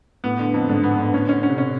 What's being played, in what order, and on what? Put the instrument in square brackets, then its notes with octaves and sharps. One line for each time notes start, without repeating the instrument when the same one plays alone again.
[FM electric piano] A2 [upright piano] B3
[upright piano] D3
F2
[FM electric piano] G#2 [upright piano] D3
[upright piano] B3
D3
[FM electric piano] A2 [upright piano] C#4
[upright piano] C#4
C#4
[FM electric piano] C3
[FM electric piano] B2 [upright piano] C#4